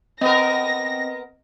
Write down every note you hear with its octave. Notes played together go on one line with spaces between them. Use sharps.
B3 C4 A#4 D#5 A#6